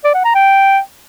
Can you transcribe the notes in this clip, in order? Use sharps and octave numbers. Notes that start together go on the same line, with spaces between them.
D5
F#5
A#5
G5